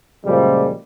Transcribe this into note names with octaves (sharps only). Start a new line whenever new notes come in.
F#2 A#2 C#3 F3 G3 G#3